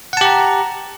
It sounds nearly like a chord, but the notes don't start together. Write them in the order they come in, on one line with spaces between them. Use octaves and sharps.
F#5 A5 G4 A#5